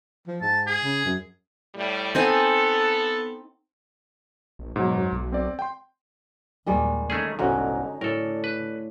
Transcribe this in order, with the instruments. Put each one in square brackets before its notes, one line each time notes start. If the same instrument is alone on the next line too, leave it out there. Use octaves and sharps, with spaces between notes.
[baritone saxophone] F3
[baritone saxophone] G#2 [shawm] A5
[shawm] G#4
[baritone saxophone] C#3
F#2
[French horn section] A2 G3
[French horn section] B3 A4 [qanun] C4 D#4 G#5
[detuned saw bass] A#1
[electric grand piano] G#2 F#3 [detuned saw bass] B2
[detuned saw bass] F#2
B1
[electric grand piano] C4 D5
G5 C6
[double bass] D#2 A#2 [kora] D#3 G3 G#3
[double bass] D3 D#4 [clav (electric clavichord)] A3 C#4 G#4
[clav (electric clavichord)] G1 C2 G#2 [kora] C#4 F#4
[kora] A2 [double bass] D3 [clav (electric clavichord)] A4 A#4
[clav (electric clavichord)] B4